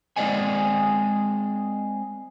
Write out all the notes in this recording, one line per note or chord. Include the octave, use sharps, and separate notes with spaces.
G#3 C4 D5 D#5 F#5 G#5